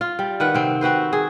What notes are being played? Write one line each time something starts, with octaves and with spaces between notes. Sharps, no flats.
F4
G3
D#3 B4 F#5
C3 C4
C4 F#4 B4 C5
G#4